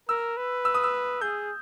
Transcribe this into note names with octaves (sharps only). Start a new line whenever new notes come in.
A#4 E6
B4
E6
D#6
E6
G#4 G6